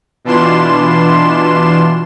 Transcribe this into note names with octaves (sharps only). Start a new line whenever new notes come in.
B2 E3 D4 F4 C6 E7